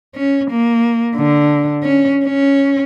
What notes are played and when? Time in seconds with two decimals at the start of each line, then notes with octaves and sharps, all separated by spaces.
0.15 C#4
0.51 A#3
1.16 D3
1.83 C#4
2.25 C#4